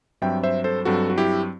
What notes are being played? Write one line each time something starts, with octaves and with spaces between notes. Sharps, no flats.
G2 F#3 C4 E5 G5
C5 E5
A4 C5
G2 F#3 C4 F#4 A4
F#4
E4 G4